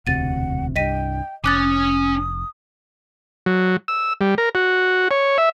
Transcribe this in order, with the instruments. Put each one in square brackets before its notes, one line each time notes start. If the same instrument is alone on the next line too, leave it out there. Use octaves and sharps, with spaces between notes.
[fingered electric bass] E1 D2 C3 [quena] F#5 [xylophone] A6 D#7
[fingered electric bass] C2 G2 [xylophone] D#5 B6 D#7 [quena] G5
[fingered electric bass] F1 [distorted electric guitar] C#4 G#5 [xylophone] D6 F#6 A6 [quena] D#6
[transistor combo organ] F#3
E6
G3
A#4
F#4
C#5
E5